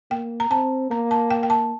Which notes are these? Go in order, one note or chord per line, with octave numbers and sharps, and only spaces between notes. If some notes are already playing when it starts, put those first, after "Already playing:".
A#3 G5
A#5
C4 A5
A#3 A#5
A5
G5
G5
A5